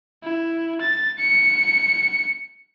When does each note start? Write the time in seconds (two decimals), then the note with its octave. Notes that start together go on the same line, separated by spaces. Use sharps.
0.22 E4
0.81 A6
1.18 C#7